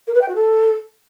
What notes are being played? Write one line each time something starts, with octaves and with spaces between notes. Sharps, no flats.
A#4
B4
G5
F#4
A4